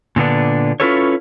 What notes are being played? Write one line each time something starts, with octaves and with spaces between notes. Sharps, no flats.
A#2 D3 B3 D4
C#4 E4 F4 A4 B4 C#5